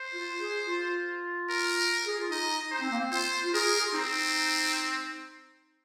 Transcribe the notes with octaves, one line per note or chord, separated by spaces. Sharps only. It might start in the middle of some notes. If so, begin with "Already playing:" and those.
Already playing: C5
F4
G#4
F4
A#4
G#4
F4
D#4 D#5
D#4 C5
C4
A#3
C4
F4 C5
F4
G#4 A#4
G#4
F4
C4 D#4